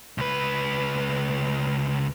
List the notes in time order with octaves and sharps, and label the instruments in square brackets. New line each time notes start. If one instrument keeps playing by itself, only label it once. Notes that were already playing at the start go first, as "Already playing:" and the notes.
[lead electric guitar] C#2 B4